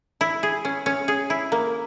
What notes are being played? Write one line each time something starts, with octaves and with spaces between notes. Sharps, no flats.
E4
G#4
C#4
C#4
G#4
E4
A#3